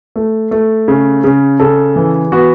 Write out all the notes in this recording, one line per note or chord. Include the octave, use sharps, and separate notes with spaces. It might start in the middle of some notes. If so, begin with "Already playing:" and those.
A3
A3
C#3
C#3
C#3 A4
E3
B3 F#4